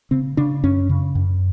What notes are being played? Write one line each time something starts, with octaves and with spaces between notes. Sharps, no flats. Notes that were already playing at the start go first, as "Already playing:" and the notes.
C#3 C4
C#3 D4
F#2 C#4
C#3
F#2